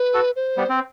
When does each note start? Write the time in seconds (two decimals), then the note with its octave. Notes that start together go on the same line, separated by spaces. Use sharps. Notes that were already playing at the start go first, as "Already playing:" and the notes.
Already playing: B4
0.14 F#4 A4
0.36 C5
0.57 G3 B3
0.69 C4